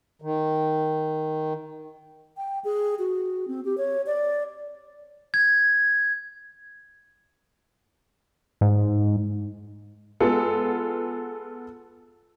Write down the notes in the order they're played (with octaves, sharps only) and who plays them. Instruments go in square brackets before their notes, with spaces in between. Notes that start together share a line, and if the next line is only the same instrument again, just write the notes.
[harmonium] D#3
[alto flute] G5
G#4
F#4
C4
G4
C#5
D5
[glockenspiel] G#6
[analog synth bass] G#2
[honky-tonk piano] G#3 B3 F4 A4